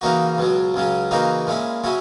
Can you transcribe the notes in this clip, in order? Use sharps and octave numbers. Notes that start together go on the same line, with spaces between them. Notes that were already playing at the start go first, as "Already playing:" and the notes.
C#3 E3 A#3 D#4 F#4
C#2 B2 F#3
C#2 C#3 F#3 C#4
C#3 E3 A#3 D#4 F#4
A#2 G#3 C#4 E4
C#3 F#3 C#4 E4